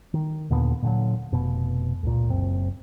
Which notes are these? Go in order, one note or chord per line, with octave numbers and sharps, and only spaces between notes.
D#3
D#2 A#2 D3 B3
A#2 D3 F#3
F1 B2
C#2 A#2
F#1 C4